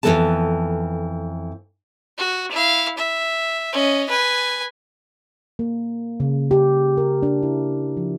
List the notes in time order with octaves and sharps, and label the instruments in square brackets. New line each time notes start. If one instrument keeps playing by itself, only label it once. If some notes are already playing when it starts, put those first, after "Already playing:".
[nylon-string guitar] F2 G#2 E3 B3 A4 A5
[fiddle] F#4
E4 F5
E5
C#4 D#5
B4 G#5
[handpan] A#3
C#3
G4
A#4
D4
E4
F3